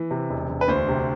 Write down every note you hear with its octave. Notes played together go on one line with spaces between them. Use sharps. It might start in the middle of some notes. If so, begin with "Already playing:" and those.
Already playing: E3
C3
E1
E1
B4
D2 C5
C3